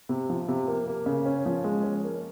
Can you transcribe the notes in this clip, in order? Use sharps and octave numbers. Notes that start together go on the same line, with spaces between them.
C3
F3
C3
A#3
A#3
C#3
C#4
F3
G#3
C#4
A#3